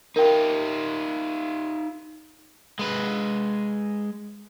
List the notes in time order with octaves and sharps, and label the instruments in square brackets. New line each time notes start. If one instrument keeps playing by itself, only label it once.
[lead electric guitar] D#4 F4 [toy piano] A#4 G5
[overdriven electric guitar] G#3 B4